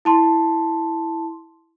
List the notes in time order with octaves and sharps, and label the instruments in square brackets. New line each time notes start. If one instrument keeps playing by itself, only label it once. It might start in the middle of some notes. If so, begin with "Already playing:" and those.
[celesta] E4 A5 C6